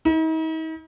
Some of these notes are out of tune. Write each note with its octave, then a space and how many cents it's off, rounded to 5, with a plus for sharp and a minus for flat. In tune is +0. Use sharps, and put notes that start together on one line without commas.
D#4 +45